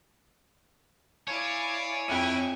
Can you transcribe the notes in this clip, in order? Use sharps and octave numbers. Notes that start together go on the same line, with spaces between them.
E4 C#5 D5 F5 G#5
F2 E4 G5 G#5 F#6 D#7